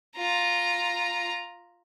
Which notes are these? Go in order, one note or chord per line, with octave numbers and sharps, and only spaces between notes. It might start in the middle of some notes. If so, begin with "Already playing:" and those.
F4 A#5